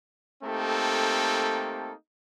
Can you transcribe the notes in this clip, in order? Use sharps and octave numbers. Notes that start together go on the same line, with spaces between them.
A3 A#3 C4 D#4 G4 A4